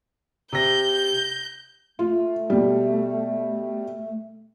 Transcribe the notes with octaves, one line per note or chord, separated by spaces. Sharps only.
C3 G6 A#6
A3 F4
B2 G3